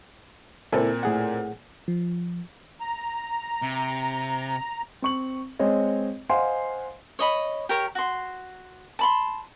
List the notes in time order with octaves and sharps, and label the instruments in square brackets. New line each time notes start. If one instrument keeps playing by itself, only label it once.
[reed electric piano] C#2 E4 A4 [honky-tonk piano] A#2 C4
[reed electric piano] A2 G#4 F#5
[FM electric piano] F3
[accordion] A#5
[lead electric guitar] C3
[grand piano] C4 C#6 F#7
G#3 C4 C#5 D#5
C5 D#5 F5 F#5 G#5 C6
[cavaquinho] C#5 D#5 B5
G4 A#4 C#5
F#4 C6
A5 B5 C6